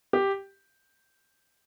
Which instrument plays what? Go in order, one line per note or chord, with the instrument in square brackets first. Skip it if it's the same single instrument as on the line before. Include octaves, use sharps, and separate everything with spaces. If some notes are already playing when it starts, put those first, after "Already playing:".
[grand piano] G4